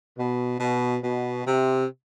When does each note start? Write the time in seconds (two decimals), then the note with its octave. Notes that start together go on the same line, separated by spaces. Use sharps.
0.17 B2
0.59 B2
1.03 B2
1.46 C3